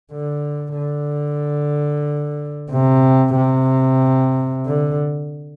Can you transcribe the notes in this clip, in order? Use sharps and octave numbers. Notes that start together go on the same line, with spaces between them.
D3
D3
C3
C3
D3